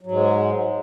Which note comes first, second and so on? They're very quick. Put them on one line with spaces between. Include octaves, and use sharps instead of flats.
F#3 G#2 G#3